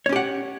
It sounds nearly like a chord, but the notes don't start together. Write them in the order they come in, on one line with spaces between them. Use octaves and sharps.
C#5 C#4 G4 F#5